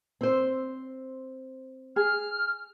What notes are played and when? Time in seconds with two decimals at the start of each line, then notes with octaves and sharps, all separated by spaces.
0.21 C4 C5
1.96 G#4 F6